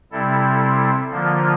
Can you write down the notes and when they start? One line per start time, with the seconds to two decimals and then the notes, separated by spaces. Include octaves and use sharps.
0.12 C3 G3 C4 E4 A4
1.11 D3 F3 A#3 F4